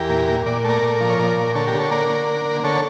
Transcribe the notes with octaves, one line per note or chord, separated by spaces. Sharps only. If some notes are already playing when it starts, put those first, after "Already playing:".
Already playing: E2 G4 A#4
A#2
A#2
A#2 D5
A3 A#4 D5
A#2
F3
C#5
A#2 A#4 D5
A#2
D3 A4 C#5
G4 A#4
D3
A4 C#5
A#3 A#4 D5
D3
A#3
D3
D3 A4 C#5